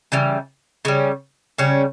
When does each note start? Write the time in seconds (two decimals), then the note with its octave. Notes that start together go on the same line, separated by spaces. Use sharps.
0.12 C#3 E3 G3
0.85 C#3 G3 C#4
1.58 C#3 G3 C#4